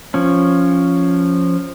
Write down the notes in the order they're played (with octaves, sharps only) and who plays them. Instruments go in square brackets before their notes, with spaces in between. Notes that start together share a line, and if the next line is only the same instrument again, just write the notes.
[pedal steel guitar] F3 C#4